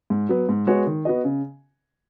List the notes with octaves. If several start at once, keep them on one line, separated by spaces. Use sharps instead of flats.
G#2
F#3 B3
G#2
G#3 B3 F#4 C#5
D#3
B3 F#4 D#5
C#3